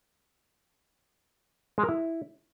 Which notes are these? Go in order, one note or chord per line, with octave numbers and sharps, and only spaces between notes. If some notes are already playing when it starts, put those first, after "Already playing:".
G#3
A#4
E4